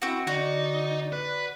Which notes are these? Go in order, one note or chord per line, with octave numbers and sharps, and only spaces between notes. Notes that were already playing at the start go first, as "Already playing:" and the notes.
C4 E4 F#4
D3 D#4 F#4 D5
B4 F#6